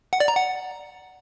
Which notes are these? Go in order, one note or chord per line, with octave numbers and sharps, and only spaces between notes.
F#5
D5
A#5
F#5